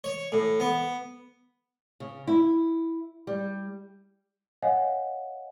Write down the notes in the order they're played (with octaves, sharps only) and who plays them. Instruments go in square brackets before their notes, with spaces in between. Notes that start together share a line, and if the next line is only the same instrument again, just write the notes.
[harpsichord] C#5
A2
B3
[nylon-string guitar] C#3
E4
G3
[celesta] C#5 D#5 F5 F#5 G#5